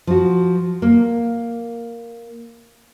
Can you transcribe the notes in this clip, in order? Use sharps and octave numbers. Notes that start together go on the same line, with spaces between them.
F3 F#4
A#3